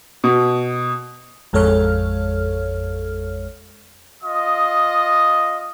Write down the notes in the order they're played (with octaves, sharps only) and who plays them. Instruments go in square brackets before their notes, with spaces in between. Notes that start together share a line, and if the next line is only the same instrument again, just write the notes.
[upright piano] B2
[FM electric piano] A1 F2 G#3 A4 C#5 F6
[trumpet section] F4 D#5 D#6